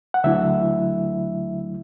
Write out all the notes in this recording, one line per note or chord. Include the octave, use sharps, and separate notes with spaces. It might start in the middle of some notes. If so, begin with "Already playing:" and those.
F#5
D2 D3 F#3 A3 E4 E5